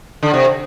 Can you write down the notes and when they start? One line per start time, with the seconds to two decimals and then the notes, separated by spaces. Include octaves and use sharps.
0.23 D3
0.33 C3